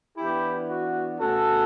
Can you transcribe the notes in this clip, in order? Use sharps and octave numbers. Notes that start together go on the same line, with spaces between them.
E3 B3 D4 E4 G4
F#4
B2 A3 C#4 F#4 A4